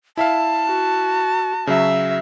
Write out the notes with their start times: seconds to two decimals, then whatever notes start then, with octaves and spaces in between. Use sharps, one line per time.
0.17 E4 E5 F5 A5
0.68 F#4
1.67 C#3 F#3 E5